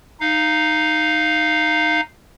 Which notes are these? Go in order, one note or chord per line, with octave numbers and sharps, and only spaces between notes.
D#4 F5